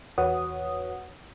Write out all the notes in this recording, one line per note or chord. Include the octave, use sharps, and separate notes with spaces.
E2 F#4 B4 C#5 F#5 D#6